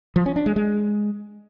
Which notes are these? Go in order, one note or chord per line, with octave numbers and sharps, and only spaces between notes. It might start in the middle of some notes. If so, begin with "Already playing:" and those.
F3
C#4
D4
G#3
G#3